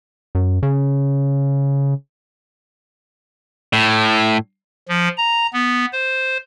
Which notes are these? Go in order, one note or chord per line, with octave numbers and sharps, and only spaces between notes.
F#2
C#3
A2
F3
A#5
B3
C5